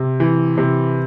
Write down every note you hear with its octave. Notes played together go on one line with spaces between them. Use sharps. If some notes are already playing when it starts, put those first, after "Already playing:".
Already playing: C3
E3
C3